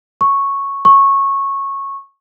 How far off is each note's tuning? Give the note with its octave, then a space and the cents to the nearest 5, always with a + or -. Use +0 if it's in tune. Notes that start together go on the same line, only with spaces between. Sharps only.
C#6 -5
C#6 -15